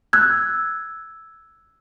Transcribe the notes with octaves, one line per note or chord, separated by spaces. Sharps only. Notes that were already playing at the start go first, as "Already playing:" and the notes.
E6 F#6 G#6